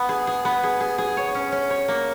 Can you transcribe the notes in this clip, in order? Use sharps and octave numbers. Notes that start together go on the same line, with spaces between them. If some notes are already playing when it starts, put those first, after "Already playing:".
Already playing: B3
G#4
G#4
B3
G#4
G#4
G#4
C#5
C#4
C#4
C#5
A#3